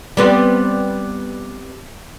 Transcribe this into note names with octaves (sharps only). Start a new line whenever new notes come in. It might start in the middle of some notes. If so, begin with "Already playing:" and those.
G3 B3 C4